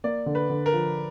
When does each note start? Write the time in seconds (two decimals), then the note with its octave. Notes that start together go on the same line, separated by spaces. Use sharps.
0.04 A#3 D5
0.26 D3
0.35 B4
0.50 D3
0.66 A#4
0.73 F3